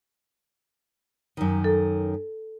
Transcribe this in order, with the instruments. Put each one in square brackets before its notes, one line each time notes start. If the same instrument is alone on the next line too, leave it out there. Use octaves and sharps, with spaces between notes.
[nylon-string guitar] F#2 D#3
[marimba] A4